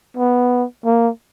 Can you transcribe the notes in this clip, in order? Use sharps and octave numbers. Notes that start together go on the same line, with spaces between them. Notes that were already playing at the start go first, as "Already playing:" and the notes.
B3
A#3